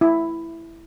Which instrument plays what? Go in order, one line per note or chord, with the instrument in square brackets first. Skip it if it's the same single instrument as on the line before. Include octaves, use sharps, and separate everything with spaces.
[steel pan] E4